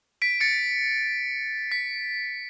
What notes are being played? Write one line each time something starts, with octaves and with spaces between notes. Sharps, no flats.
B6 D7
A6 C#7
B6